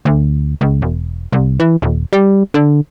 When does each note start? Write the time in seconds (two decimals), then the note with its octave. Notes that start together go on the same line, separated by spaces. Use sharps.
0.05 D2
0.61 C#2
0.82 E1
1.32 C2
1.60 E3
1.82 D#1
2.13 G3
2.54 D3